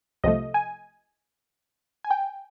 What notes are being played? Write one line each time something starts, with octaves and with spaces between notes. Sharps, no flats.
C2 C3 F3 A3 D#5
G#5
G#5
G5